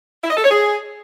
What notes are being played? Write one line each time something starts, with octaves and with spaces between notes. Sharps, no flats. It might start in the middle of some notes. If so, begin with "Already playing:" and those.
E4
D#5
A4
C#5
G#4